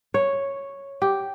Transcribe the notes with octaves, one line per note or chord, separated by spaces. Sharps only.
C#5
G4